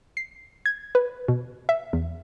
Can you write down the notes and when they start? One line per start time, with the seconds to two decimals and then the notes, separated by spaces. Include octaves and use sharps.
0.17 C7
0.66 G#6
0.95 B4
1.28 B2
1.69 E5
1.93 E2